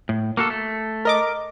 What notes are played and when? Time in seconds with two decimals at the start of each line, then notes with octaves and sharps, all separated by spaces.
0.09 A2
0.37 A#3 F#4 A4
0.50 A3
1.05 A#4 D#5 D6